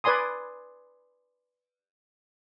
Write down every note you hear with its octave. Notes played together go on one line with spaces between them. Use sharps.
B4 D5 G#5 C6 D#6